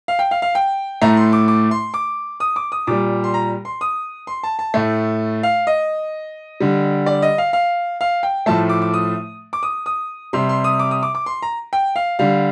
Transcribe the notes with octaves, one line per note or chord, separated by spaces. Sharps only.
F5
G5
F5
F5
G5
A2 A3 A#5
C6
D6
D6
C6
D6
D#6
D6
D#6
A#2 G3 D6
C6
A#5
C6
D#6
C6
A5
A5
A2 A3
F5
D#5
D3 G3
D5
D#5
F5
F5
F5
G5
A2 F3 A3 A5
D6
D6
D#6
D6
D#6
D#6
C3 G3 C6
C6
D#6
D6
D#6
D6
D6
C6
A#5
G5
F5
D3 G3 F5